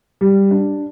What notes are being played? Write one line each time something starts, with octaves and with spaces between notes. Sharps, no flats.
G3
D4